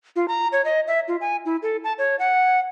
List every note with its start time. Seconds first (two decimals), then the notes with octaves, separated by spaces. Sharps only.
0.16 F4
0.28 A#5
0.52 C#5
0.65 D#5
0.87 E5
1.08 F4
1.21 G#5
1.45 E4
1.63 A4
1.84 A5
1.98 C#5
2.19 F#5